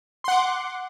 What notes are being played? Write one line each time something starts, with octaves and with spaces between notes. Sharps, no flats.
F#5 C6 D6